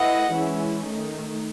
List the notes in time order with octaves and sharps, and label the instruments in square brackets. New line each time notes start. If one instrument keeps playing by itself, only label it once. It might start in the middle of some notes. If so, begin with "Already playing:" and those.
Already playing: [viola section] A3 E4 B4 D#5 [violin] F#5
[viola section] E3 G#3 C#4 E4
D#3 A3 D#4